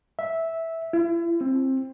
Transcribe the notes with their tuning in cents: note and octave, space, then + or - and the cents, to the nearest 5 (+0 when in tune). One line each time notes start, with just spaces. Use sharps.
E5 -10
E4 +40
C4 +20